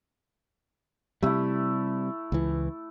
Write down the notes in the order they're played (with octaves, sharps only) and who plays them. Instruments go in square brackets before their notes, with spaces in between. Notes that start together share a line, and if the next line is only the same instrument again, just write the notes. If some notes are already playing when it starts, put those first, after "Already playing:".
[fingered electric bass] C3 G3 [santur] A3 E4
[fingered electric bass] C#2 E3